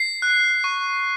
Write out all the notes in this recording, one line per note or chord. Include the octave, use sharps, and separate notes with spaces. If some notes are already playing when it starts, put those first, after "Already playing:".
Already playing: C7
F#6
C#6